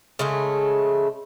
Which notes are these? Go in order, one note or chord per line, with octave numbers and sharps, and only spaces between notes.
C#3 G#3 A3